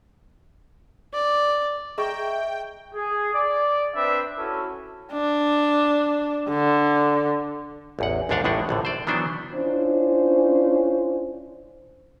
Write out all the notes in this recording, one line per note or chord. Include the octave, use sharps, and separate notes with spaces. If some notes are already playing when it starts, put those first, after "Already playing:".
D5
G#4 D#5 E5 G5 A#5 C#6
G#4
D5
C4 D4 B4 E5
C#4 E4 F#4 A4
D4
D3
A1 E2 F#5
A#1 D#2 G#2 D4 F5 F#5
A1 A2 G#3 D4 D#4 F#5
A#1 A2 D3
C5 D5
D#3 E3 F#3 B3 D4 C5
C#4 D4 E4 F4 C5